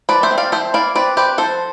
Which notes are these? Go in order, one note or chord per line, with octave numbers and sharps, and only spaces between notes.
F3 B4 D5
C5 E5
C4
D5 F5
F3 C5 E5
E4 D5 F5
C4 B4 D5
C4 G4 B4
F3 A4 C5